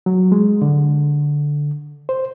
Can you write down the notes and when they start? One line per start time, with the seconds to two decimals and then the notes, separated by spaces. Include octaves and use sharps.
0.06 F#3
0.32 G#3
0.62 D3
2.09 C5